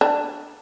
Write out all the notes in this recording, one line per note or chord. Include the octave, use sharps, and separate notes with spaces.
D4